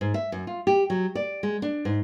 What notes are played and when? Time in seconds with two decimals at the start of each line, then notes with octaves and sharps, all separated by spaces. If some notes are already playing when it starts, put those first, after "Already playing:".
0.01 G#2
0.14 E5
0.32 F#2
0.47 F4
0.67 G4
0.90 F#3
1.15 D5
1.43 G#3
1.62 D4
1.85 G#2